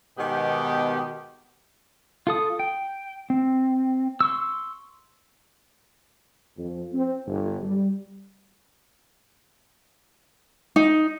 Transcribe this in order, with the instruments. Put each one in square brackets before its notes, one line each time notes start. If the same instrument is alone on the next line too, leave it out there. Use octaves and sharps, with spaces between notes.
[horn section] G#2 B2 D#3 B3 G4
[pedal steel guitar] F4 A4 D#6
G5
C4
C6 C#6 E6
[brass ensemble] F2
C4
G1
G3
[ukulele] D#4